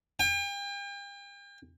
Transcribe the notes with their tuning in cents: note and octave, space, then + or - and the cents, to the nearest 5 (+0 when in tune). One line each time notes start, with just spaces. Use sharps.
G5 +40